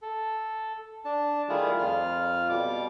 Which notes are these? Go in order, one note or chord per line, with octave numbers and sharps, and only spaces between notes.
A4
D4 A5
D#3 G3 A3 E4 F4 G#4
F2 F4 F6
B2 G3 D6